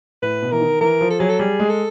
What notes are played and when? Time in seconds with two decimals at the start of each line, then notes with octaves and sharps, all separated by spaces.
0.22 A2 B4
0.42 B2
0.51 E3 A#4
0.61 D#3
0.81 E3 A#4
1.01 F3
1.10 A4
1.19 F#3 G#4
1.29 A4
1.39 G3 G#4
1.60 G#3
1.69 A4